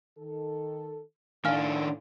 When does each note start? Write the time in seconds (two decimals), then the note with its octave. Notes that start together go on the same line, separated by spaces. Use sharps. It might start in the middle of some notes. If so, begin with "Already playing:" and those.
0.18 D#3 A4
1.45 A2 D#3 D4 F5 G#5 F6